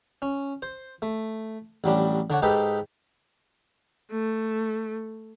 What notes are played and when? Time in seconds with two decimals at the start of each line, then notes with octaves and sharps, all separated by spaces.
0.22 C#4
0.62 C5
1.02 A3
1.84 A1 F#3 G3 D4
2.30 D3 D4 C#5 F#5
2.42 G#2 D#4 G4 A4 B4
4.11 A3